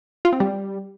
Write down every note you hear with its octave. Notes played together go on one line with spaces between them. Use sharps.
F4
C4
G3